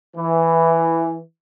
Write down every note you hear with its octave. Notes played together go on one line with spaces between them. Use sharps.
E3